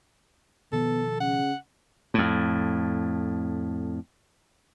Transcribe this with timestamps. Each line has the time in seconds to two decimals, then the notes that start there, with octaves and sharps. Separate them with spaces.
0.72 B2 D#3 F3 B3 A4
1.20 C#3 F#5
2.14 F2 A2